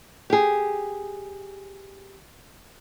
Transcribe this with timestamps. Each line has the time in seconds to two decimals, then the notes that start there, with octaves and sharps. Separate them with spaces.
0.30 G4 G#4